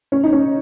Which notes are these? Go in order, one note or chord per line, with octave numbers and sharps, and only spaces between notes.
C#4
D#4
C#4